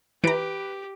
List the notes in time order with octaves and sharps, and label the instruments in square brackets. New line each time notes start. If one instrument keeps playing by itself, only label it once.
[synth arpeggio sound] E3 A#5 [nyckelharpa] G4 [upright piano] B4 D7